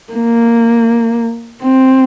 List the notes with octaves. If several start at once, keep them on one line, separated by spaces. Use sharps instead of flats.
A#3
C4